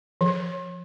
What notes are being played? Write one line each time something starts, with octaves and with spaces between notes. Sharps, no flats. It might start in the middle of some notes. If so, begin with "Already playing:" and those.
F3